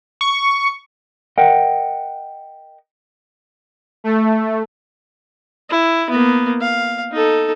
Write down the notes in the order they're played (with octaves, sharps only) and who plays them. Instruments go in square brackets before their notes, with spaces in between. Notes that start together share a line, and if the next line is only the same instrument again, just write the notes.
[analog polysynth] C#6
[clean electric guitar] A#4 D#5 F#5 G5
[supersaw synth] A3
[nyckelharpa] E4
A#3 B3
F5
D#4 A4